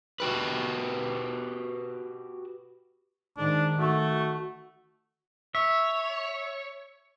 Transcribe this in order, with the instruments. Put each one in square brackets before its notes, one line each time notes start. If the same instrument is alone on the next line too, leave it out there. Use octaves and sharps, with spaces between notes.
[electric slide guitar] F#4 G4 B4
[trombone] G#2 [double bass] D#3 [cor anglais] D4
[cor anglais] A3 [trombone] F#4
[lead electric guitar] C#5 [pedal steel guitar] E5